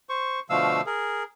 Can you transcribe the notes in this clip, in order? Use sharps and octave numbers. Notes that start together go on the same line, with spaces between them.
C5 C#6
B2 D3 F3 A3 F5 E6
G#4 A#4